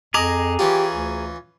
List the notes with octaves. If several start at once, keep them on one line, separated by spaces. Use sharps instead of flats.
F2 G#4 D#5 A#5 D6
E3 C#4 F4 G4
D2